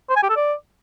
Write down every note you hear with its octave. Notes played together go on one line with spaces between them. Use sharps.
C5
G#5
G4
A4
D5